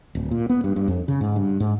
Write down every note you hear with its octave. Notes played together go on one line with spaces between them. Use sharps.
D1
A#2
B3
G2
G2
F2
C#3
G#2
G2
G#2